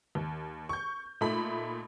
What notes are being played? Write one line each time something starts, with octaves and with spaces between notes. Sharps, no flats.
D#2
C#6 G6
A#2 A3 D#4 B5